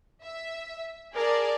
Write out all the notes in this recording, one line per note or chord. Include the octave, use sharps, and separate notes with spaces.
E5
G#4 A#4 D5 A5